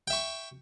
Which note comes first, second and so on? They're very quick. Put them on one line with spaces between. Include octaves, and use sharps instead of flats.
G5 E5 C#6